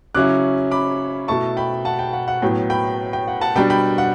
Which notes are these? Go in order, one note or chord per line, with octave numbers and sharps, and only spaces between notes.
C#3 F#3 C#4 E4 D6 F#6
B5 D6
B2 A3 E4 A5 C#6
G5 B5
F#5 A5
G5
F#5
F#5
A2 F#3 B3 G5
G5 B5
G5
F#5
F#5 A5
B2 G3 D4 G5 B5
G5 B5
F#5